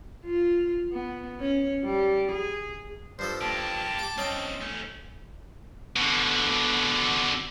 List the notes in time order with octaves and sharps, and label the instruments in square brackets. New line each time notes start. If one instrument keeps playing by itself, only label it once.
[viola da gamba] F4
B3
C#4
G3
G#4
[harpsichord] G2 F3 A4 [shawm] C5
[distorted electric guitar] A#3 G4 [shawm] A5
[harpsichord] G5 D6
[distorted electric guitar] C4 D#4 [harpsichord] C#4 D#5 G5
[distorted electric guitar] A3 C#4
B2 D3